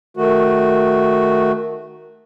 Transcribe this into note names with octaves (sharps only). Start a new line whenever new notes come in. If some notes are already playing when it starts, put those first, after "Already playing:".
D#3 A3 F#4